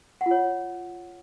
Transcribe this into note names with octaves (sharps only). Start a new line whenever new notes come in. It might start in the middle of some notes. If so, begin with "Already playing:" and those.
F#5
F4
C#5